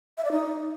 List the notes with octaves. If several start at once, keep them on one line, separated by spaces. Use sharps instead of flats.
E5
D5
D#4